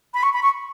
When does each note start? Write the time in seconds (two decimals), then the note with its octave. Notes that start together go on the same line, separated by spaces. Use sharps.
0.14 B5
0.23 C#6
0.33 B5
0.42 C#6